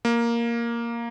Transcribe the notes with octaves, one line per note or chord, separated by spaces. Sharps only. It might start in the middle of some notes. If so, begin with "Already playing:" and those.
A#3